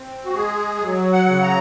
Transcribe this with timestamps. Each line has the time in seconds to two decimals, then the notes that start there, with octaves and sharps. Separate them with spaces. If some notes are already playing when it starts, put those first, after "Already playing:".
Already playing: C4
0.25 F#4
0.34 G#3 G#4
0.81 F#3
1.13 F#5
1.28 C#3
1.43 A#5